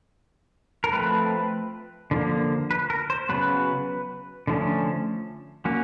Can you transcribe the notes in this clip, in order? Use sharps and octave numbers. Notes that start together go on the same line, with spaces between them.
A#4
F3 A3 C4 B4
D3 F3 A#3
B4
A#4
C5
C#3 F#3 B3 B4
D3 F3 A3 C#4
F#3 A#3 C#4